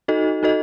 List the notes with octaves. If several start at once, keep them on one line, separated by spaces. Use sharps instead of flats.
D#4 F#4 A4 D#5
D#4 F#4 A4 D#5